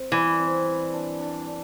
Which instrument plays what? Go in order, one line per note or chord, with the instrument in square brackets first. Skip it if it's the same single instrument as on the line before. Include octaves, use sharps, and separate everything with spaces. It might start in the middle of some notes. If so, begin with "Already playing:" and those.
Already playing: [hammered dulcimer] C4
[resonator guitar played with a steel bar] E3 [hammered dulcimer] G3
[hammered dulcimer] C4
G3
D4
D4
D4